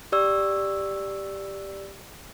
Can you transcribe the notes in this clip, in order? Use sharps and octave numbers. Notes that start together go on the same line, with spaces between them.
G4 D5 E6